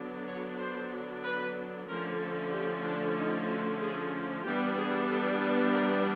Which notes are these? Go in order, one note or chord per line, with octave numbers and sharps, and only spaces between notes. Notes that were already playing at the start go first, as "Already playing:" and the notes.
Already playing: D3 F#3 B3 D4
C#5
C5
B4
D3 F3 A3 C#4 A#4
A4
G4
D4
D#4
F#4
G#4
E3 G3 B3 D4 G4
G#4
A4
B4
A#4